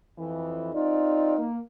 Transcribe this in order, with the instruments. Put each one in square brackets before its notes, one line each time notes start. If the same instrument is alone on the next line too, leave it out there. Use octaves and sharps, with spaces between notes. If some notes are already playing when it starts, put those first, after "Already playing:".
[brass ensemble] F2 E3
[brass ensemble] C4 F4 D5 [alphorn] D#4
[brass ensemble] A#3